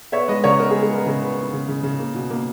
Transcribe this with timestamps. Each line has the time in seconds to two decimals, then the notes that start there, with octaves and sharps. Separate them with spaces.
0.12 B3 C#5 E5
0.28 G#3 B4 D#5
0.44 C#3 A#4 C#5
0.59 B3 A#4
0.71 G#4
0.75 G#3
0.82 G#4
0.91 B3 A#4
1.06 C#3 A#4
1.21 B3
1.37 B3
1.53 C#3
1.68 C#3
1.83 C#3
1.99 A#3
2.14 B2
2.30 A#3